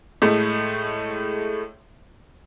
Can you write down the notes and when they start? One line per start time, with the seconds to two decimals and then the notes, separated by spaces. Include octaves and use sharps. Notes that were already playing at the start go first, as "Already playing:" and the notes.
0.22 A2 G#3 A3